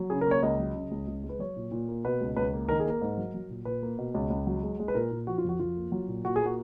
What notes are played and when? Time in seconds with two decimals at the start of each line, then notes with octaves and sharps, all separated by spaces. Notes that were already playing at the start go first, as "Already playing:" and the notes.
Already playing: F#3
0.10 C#3 G#4
0.21 A#4
0.27 A#3 C#5
0.43 C#2 D#5
0.59 F#3
0.75 C#3
0.91 C#2
1.08 C#2
1.24 G#3
1.29 B4
1.39 F#3 C#5
1.56 A#2
1.71 A#2
1.88 A#3
2.05 B2 B4
2.21 C#2
2.36 C#2 B4
2.53 A#3
2.68 D#3 A#4
2.80 G#4
2.85 A#3 A#4
3.01 G#2
3.17 F#3
3.34 F#3
3.50 A#2
3.65 A#2 B4
3.83 A#3
3.98 B2
4.14 C#2
4.30 C#2
4.47 F#3
4.63 G#3
4.80 G#3
4.88 B4
4.95 A#2 A#4
5.11 A#2
5.27 F3 F#4
5.38 F4
5.44 F2 F#4
5.59 F2 F4
5.77 A#3
5.92 F#3
6.08 A#2
6.24 A#2 F#4
6.36 G#4
6.41 A#3 F#4